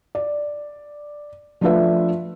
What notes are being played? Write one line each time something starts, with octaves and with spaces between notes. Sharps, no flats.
D5
F3 A3 D4 F4 B4 E5